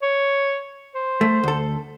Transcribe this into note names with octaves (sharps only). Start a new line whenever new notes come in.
C#5
C5
A3
D2 A4